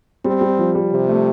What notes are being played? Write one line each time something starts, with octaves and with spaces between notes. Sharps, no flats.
G3 C4
G3
F3
G3
C3
A3